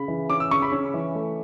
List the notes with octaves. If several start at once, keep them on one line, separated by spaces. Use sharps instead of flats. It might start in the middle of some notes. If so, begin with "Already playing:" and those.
Already playing: C#3 B5
E3
C#4 D6
E6
C#3 C#6
B5
C#4
E3
A3